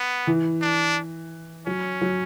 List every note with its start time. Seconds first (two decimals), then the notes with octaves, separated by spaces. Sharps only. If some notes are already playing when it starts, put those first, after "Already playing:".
Already playing: B3
0.27 E3
0.62 D4
1.67 F#3 C#4
2.01 F#3